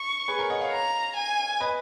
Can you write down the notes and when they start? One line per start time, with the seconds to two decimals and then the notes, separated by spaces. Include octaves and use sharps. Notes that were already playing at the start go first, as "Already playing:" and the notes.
Already playing: C#6
0.28 G#4 B4
0.39 A#4 C#5
0.50 D#5 F#5
0.61 C#5 F5
0.72 A#5
1.16 G#5
1.60 B4 D#5